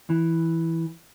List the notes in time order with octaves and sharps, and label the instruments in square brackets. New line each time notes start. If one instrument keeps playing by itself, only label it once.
[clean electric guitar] E3